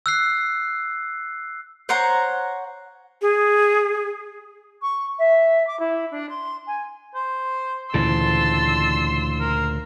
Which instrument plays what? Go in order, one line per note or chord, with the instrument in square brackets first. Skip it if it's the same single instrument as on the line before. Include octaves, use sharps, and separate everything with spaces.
[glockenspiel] E6 F#6 C7
[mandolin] C5 C#5 F#5 A#5
[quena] G#4
[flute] C#6
E5
D6
E4
D4
C6
G#5
[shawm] C5
[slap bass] D2 A#2 C#3 [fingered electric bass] E3 [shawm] A5 [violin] C6 E6
[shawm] A#4